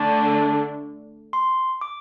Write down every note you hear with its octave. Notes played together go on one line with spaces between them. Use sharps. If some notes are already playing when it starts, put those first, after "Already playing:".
Already playing: D3 A3 D4 A5
C6
D6